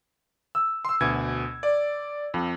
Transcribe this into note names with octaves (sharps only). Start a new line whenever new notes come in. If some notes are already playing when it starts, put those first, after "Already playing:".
E6
C6 E6
D2 B2 G#6
D5
F2